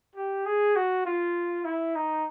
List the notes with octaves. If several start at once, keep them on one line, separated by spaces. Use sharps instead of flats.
G4
G#4
F#4
F4
E4
D#4